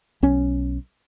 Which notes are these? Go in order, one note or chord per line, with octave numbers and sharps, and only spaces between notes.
B1 C#4